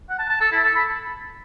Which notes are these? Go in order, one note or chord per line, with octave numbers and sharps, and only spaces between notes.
F#5
A5
A5
A4
E4
A4
B5